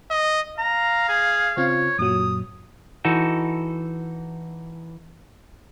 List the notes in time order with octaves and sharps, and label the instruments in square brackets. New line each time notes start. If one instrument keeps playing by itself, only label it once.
[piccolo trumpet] D#5
[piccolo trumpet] F5 [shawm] A#5
[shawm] G#4
[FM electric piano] C#3 C4 F4 [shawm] C#5
[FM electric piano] F#2 A#2 F#3 [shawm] D#6
[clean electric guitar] E3 D#4 F#4 A4